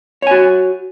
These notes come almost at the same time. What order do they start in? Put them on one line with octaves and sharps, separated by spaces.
C#5 G#5 F#4